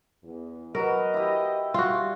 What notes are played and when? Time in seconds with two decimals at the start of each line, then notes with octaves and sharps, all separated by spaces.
0.23 E2
0.75 F#3 A#4 B4 D#5
1.14 E4 G4
1.74 G3 F4 F#4 C6